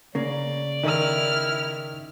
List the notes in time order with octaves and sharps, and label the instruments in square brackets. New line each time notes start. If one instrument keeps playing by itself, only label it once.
[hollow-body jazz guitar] C#3 A#3 [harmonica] D5
[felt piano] D#3 A#4 [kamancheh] E4 F6